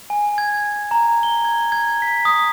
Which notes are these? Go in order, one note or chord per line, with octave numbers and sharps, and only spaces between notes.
G#5
G#6
A#5
G7
G#6
G#6
B6
D#6